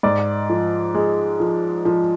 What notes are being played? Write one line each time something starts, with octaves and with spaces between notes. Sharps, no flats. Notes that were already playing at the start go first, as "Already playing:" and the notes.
G#2 D5
F3
G#3
F3
F3